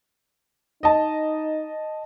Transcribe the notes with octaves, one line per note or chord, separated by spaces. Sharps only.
D#4 D#5 A5